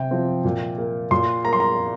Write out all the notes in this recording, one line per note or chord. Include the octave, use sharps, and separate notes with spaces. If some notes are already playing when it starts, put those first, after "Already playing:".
Already playing: C3 G5
F3 C4
A#2
A#3
A#2 C6
A#3 A#5
C6
A#5